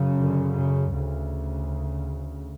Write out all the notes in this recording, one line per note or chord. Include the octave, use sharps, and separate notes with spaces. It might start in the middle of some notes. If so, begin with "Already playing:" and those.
Already playing: F#2 C#3
D3
C#3
D2 C#3